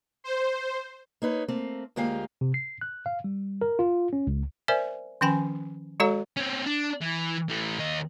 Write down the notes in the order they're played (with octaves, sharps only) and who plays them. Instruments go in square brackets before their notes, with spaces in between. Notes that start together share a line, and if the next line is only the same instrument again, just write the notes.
[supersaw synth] C5
[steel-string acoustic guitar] A#3 D#4 B4 C#5
A3 A#3 C4
D2 G#3 A#3 F4 G4 F5
[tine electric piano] C3
C7
F#6
F5
G3
A#4
F4
C#4
C#2
[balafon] A#4 C5 D5 E5 G#5
D#3 F3 C#4 G5 G#5 B5
G#3 F#4 A4 C#5 F5 A#5
[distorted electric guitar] C4 C#4
D4
E3
E3 A3
D#2 D#5